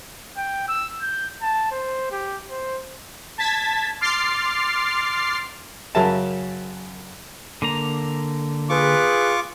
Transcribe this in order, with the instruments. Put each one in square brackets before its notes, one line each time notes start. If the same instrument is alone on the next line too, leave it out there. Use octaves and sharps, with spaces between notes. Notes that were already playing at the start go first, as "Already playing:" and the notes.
[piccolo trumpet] G5
E6
G6
A5
C5
G4
C5
[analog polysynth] A5 G#6 A6 B6
C6 D6 F6 A6 C7
[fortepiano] F#2 C#3 F#3 A#4 E5 A5
[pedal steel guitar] D3 A#3 A#5
[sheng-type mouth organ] F4 C#6 D6 [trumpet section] G#4 B4